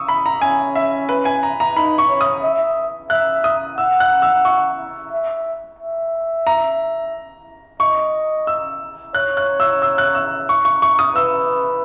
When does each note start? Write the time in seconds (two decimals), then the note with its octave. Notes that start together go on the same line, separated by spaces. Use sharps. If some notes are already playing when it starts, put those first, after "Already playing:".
Already playing: C#6 D#6 E6
0.09 B5
0.26 A#5
0.42 C#4 G#5
0.75 E5
1.09 B4
1.25 G#5
1.43 A#5
1.60 A#5
1.76 D#4 B5
1.98 C#6
2.09 C#5
2.21 D#6
2.43 E5
3.10 E5 F#6
3.44 D#6
3.78 F#5 E6
4.00 F#6
4.22 E6
4.45 C#6
5.11 E5
5.79 E5
6.47 A#5
7.80 D#5 C#6
8.47 E6
9.15 C#5 F#6
9.37 F#6
9.60 E6
9.82 E6
9.98 F#6
10.15 E6
10.49 C#6
10.65 C#6
10.82 C#6
10.99 D#6
11.16 B4 E6